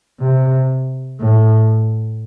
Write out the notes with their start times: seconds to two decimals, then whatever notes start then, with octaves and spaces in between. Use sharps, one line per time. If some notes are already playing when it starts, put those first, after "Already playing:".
0.20 C3
1.20 A2